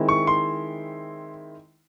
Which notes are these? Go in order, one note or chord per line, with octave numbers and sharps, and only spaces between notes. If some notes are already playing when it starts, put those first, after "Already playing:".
Already playing: D#3 G#3 C4 E4
C#6
C6